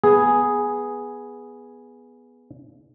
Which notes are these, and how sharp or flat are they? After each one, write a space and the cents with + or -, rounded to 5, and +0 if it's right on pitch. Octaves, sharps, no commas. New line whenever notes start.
B3 -5 G#4 +0